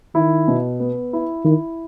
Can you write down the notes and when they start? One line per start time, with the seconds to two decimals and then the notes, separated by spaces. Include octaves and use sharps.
0.15 D#3 E4
0.48 B2
0.80 B3
1.13 E4
1.45 D#3 E4